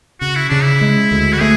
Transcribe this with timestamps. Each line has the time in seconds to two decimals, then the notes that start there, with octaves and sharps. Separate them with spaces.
0.21 C#3 F#4
0.35 E4
0.49 C#3 D4
0.63 E4
0.81 G#3
1.11 D2
1.33 F#4
1.41 A3 G#4